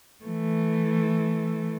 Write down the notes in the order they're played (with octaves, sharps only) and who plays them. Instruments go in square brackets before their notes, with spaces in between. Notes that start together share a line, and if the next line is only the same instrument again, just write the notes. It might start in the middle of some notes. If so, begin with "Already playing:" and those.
[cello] E3 A3